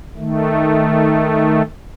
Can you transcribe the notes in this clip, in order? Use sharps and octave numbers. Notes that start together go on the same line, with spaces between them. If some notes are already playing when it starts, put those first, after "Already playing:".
D#3 A3